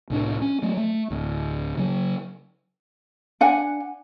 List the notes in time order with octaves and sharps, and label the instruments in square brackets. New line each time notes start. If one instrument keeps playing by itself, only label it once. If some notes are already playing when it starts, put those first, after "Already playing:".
[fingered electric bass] C2 A2 D4
C#4
F#3 A3
A3
D1 D2
C#3 F#3
[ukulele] D4 F#5 G#5